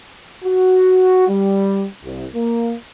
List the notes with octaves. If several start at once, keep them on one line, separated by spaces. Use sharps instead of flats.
F#4
G3
C2
A#3